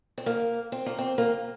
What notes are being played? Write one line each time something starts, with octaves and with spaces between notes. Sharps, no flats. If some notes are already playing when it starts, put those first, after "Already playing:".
C4
A#3
C4
A#3
C4
A#3